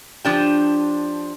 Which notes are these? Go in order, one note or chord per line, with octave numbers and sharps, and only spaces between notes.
F3 D4 G4